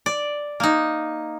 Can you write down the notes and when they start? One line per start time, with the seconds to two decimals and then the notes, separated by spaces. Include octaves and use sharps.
0.06 D5
0.60 A#3 D#4